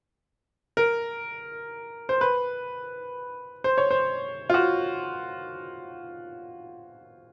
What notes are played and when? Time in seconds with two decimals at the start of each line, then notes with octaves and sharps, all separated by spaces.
0.77 A#4
2.09 C5
2.21 B4
3.64 C5
3.78 C#5
3.91 C5
4.50 F4
4.54 F#4